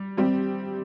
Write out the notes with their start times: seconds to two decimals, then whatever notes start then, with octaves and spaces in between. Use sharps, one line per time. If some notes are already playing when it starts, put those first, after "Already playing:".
Already playing: G3
0.17 G3 C4 G4